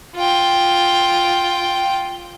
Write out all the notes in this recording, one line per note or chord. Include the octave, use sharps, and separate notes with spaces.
F4 G5